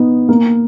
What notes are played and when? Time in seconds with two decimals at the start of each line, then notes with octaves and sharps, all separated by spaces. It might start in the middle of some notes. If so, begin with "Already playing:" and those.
Already playing: B3 D#4
0.29 A#3